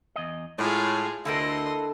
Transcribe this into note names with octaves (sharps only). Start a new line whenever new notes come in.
E2 D#5
A2 G#3 F4 G#4 D#5
D2 D3 C4 E4 A4 A#4 D#5 C6